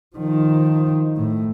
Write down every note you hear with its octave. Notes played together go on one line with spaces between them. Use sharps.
D#3 F3
A2